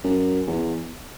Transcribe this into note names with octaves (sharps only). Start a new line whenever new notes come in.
F#2
E2